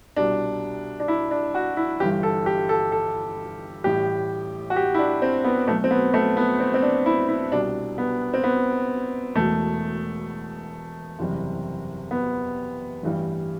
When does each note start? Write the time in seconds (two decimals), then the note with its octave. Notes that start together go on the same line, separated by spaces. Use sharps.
0.16 C2 B2 G3 D4
1.00 D4
1.08 E4
1.31 D4
1.55 F#4
1.77 E4
2.00 G1 G2 E3 G3 G4
2.23 A4
2.46 G4
2.69 A4
2.92 A4
3.84 A1 A2 G3 G4
4.70 F#4
4.76 G4
4.95 E4
4.99 D4
5.22 C4
5.44 B3
5.68 B1 B2 F#3 A3
5.84 C4
5.91 B3
6.14 A3
6.37 B3
6.60 C4
6.74 C4
6.83 D4
7.06 E4
7.29 E4
7.51 C2 B2 G3 D4
7.98 B3
8.34 C4
8.44 B3
9.36 E1 E2 B2 A3
11.19 F#1 E2 C3 G3
12.11 B3
13.03 A1 G2 E3 G3